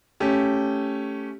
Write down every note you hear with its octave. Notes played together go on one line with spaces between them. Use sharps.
A3 C#4 G4